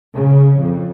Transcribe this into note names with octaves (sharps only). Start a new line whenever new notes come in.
C#3
F2